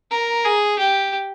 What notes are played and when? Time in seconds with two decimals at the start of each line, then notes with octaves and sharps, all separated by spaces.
0.11 A#4
0.45 G#4
0.79 G4